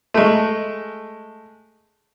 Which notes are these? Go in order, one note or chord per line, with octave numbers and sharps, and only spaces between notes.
G#3 A3